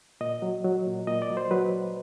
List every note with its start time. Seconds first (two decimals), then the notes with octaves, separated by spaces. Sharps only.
0.21 A#2 D#5
0.42 F#3
0.64 F#3
0.86 A#2
1.07 A#2 D#5
1.22 D5
1.30 F#3
1.37 C5
1.51 F#3 B4